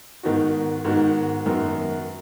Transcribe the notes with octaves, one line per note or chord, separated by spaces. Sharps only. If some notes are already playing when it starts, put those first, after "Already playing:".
G#2 D#3 B3 D#4 F#4
G#2 D#3 B3 D#4 F#4
F#2 D#3 B3 F#4